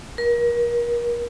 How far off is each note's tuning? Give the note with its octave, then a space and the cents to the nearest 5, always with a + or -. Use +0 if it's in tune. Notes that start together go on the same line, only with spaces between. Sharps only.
A#4 +35